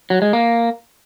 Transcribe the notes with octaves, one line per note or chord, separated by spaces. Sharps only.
F#3
G#3
A#3